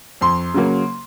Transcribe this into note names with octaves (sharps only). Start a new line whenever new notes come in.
F2 C6
C#3 F#3 A#3